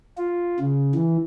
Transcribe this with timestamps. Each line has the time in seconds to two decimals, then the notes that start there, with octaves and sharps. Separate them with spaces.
0.18 F4
0.60 C#3
0.95 E3